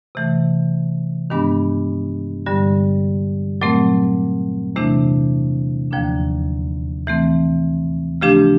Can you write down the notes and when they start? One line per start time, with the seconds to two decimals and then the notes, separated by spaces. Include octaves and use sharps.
0.15 C3 E3 A3
1.30 G2 D#3 G#3 B3 D4
2.46 G2 D3 G3
3.61 A#2 F#3 A3 C4
4.76 E2 C3 E3 A3 D4
5.91 D#2 D3 F3 A#3 D4
7.07 E3 A3 C4
8.21 C#3 F3 A3 D4 G4